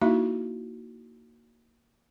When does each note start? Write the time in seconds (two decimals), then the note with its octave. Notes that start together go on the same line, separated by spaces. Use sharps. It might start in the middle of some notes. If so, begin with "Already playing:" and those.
0.01 A#3 D#4 E4 F#4 E5